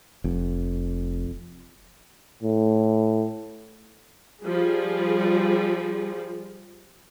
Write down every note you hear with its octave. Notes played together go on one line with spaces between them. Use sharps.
F1 F2
A2
F3 G3 G#4